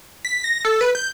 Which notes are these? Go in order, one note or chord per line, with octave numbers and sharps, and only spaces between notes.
B6
A#6
A4
B4
G6